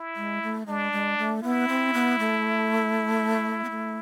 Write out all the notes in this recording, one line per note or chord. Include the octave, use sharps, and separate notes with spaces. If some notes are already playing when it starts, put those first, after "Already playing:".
Already playing: E4
G#3
A3
G#3 D4
G#3
A3
B3 E4
C4
B3
A3
B3
A3